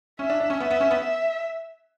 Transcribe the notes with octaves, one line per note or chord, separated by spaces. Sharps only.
C#4 E5
D4
D4
C#4
B3 E5
B3
C#4
B3
E5